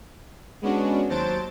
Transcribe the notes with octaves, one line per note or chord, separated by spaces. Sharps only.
G#3 B3 C#4 D4 F#4
D#2 F#3 C5 A5 A6 D7